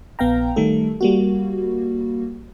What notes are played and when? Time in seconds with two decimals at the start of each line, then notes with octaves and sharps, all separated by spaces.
0.19 A#1 B3 F5 G5 A#5
0.56 D#3 G3 A3 A4
1.01 G3 A#3 F#4